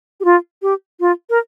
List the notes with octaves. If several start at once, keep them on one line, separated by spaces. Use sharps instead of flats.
G4
F4
G4
F4
A#4